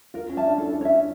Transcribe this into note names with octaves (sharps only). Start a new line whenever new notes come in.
F4 A#4
C#4
E5 A5
D4
E4 A4
D4
C#4 C#5 E5
D4